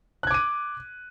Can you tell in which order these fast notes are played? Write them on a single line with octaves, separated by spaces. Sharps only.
F#6 G#6 D6 D#7